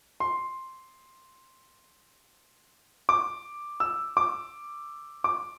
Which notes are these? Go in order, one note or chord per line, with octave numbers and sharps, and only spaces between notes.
C6
D6
E6
D6
D6